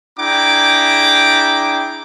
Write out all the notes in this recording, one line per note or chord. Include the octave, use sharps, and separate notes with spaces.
D4 E4 G#4 G5 A#5 D6